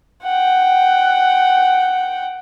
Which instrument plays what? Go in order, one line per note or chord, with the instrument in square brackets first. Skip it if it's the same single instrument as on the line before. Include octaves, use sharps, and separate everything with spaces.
[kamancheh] F#5 G5